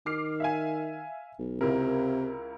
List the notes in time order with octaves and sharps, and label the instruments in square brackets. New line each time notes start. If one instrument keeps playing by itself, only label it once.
[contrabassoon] D#3 [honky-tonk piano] D6 F6 C7
[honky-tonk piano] E5 F5 G#5
[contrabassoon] B1
[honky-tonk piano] C#2 E4 A#4 [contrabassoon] C3